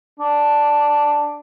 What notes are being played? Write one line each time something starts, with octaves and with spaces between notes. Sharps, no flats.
D4